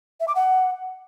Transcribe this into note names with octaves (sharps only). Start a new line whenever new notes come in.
E5
D6
F#5